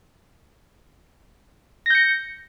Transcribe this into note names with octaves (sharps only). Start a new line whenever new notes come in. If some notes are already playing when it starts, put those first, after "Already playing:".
G6 A#6 C#7